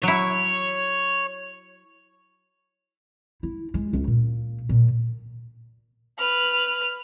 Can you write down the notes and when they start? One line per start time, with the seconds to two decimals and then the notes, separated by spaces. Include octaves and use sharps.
0.03 F#3 E4 C#5
3.43 E4
3.74 G#3
3.93 C#2
4.07 A#2
4.69 A#2
6.19 B4 F6